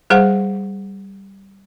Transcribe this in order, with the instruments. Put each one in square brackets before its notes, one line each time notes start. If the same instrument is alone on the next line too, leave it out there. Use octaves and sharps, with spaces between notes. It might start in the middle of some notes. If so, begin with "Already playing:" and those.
[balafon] G3 G#4 C5 F#5